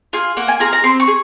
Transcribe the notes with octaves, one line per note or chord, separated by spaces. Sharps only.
F4 G#4
A#3 F#5
G#5
F4 G#4 A#5
A#5
C4 C6
C#6
G#4